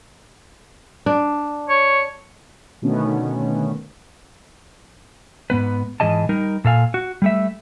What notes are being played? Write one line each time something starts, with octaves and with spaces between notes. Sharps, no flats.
D4
C#5
B2 D3 D#3 A3 B3 C#4
G#2 B3 B4
G#2 E3 G#4 D#5 A5
G3 D#4 A#4
A#2 A4 F5 G#5
F#4
G3 A3 E5